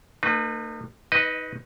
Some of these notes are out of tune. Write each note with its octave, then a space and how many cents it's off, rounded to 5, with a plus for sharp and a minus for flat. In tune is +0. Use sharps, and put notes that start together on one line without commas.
A#3 -45 D#4 -35 B4 +0
D#4 +25 B4 +0 D#5 -10